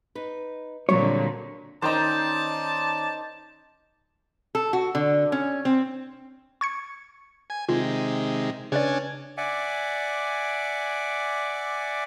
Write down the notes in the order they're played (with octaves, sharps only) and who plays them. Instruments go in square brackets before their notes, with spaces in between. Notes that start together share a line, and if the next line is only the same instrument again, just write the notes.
[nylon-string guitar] D#4 B4
[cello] A#2 D3 [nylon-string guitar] F#3 G3 C4 [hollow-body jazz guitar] C#5
[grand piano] D#3 G5 A#5 [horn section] C#4 D5 A5 [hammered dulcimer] D#4 C5
[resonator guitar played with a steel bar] A4
F#4
D3
C#4
C4
[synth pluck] C#6 G#6 C#7
[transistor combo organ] G#5
[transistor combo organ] C3 D#3 G#3 [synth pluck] F4
[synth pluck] C#3 B4 D5 [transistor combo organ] C#4 D4 G#5
[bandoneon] D5 E5 F#5 G#5 D6